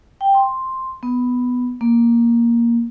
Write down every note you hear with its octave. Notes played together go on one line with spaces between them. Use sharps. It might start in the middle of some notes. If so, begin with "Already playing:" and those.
G5
C6
B3
A#3